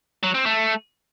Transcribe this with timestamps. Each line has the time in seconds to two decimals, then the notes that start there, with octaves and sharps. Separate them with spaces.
0.23 F#3
0.35 C4
0.46 A3